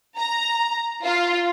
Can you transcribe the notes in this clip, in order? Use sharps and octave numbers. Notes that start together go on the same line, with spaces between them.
A#5
F4